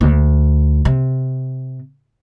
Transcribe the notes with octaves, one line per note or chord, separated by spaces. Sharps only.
D2
C3